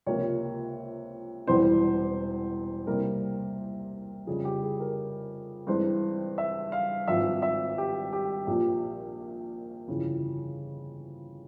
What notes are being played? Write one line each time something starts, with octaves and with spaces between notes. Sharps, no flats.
C#2 C3 F3 A#3 C#5
E1 E2 E3 G3 C4 C5
C2 C3 G3 A#3 A#4
F2 C#3 G3 G#4
G4
G#4
A#4
G2 E3 G#3 C4 C5
E5
F5
G#1 G2 F3 E5
E5
G4
G4
A#1 A#2 F3 G4
G1 F2 C#3 E3